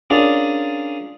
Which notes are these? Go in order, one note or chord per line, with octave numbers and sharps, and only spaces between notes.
C#4 D4 F4 G#4 A#4 D5